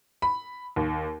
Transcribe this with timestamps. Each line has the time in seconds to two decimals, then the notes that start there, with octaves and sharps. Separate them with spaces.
0.22 B5
0.76 D#2